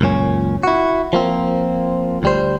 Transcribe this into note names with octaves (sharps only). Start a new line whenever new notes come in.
C#2 F#2 A#2 C#4
E4 F#4
F3 A#3 C4
D2 G3 C5